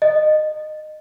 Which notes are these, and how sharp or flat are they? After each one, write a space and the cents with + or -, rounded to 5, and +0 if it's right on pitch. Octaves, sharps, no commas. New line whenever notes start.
D#5 -20